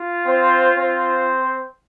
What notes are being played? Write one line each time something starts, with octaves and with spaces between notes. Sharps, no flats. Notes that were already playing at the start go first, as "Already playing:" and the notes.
Already playing: F4
C4 C5
C4 C5